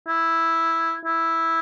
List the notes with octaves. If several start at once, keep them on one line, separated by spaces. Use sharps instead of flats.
E4
E4